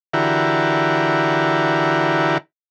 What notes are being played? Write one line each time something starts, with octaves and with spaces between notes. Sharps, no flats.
D3 E3 E4 F#4 G4 A#4